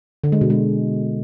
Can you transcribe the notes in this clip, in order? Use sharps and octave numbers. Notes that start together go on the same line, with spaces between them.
D3
G#3
B2
G#3